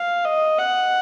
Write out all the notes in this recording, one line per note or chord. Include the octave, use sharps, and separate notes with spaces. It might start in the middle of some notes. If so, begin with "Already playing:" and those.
Already playing: F5
D#5
F#5